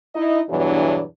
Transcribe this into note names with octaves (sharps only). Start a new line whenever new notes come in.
D#4 E4 D#5
E2 G2 B2 E3 F#3 D4